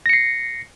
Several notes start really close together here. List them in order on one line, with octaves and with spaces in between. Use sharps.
A#6 C#7 C7